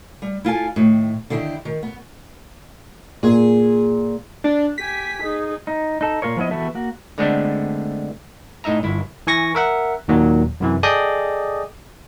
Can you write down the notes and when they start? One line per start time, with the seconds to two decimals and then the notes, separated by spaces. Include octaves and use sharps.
0.22 G3
0.45 E4 F4 A4 G#5
0.76 A2 D#3
1.30 D3 D#3 E4 G4
1.65 D#3
1.83 B3
3.23 A#2 G#4
4.44 D4
4.78 G4 G#5 B6
5.22 D#4 G#4
5.67 D#4
6.01 D#4 A4
6.22 A#2 F4 A#4 C#5
6.37 F3 B3 E4 C#5 D#5
6.51 E3 B3 F#4 G4 A4 E5
6.75 A#3 F#4
7.18 D3 G#3 A3 B3 C4 D4
8.64 A2 D#4 D#5 E5 A#5
8.83 G1 E4
9.27 E3 G#5 C#6 A#6
9.55 A#4 E5 F#5
10.08 D#2 A#2 D#3 F#3
10.60 F#2 C3 E3
10.83 G#4 A4 D5 D#5 G5 D#6